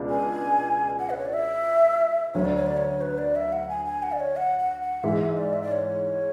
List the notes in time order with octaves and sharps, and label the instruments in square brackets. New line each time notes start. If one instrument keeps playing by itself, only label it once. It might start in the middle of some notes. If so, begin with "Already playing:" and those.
Already playing: [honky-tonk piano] C#2 B2 G#3 D4
[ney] G#5
F#5
B4
C#5
D5
E5
[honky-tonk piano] D2 D3 F#3 [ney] C#5
[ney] D5
C#5
D5
C#5
B4
D5
E5
F#5
G#5
G#5
F#5
D5
C#5
F#5
F#5
F#5
[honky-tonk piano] G#2 E3 G#3 [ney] E5
[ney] D5
E5
D5
C#5